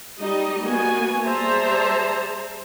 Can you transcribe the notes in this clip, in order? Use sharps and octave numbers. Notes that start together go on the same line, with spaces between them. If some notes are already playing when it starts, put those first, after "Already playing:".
G3 D#4 G4 D#5
A#3 B3 F#4 G#5
G3 G#4 C5 E5 A5 A#5